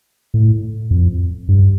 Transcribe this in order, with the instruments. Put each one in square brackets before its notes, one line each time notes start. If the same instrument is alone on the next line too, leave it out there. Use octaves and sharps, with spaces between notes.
[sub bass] A2
F2
G2